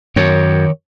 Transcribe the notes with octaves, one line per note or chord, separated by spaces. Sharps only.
F#2 D#3 A#4 C#5